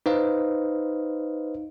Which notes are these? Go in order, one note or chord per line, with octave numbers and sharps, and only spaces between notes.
D#4 B4 C5 D#5 F5